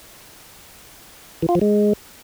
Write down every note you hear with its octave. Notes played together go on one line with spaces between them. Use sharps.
E3
F4
F3
G#3